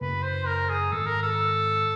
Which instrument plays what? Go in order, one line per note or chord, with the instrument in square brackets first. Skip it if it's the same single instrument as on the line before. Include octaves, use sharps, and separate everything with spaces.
[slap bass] F#2 C#3 F#3 A#3 [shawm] B4
[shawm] C5
A#4
G#4
[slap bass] G#2 D#3 G#3 [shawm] A4
[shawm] A#4
A4